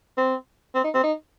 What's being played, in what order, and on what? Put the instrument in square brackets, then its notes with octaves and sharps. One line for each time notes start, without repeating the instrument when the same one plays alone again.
[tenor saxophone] C4
C4
D#4
C4
D#4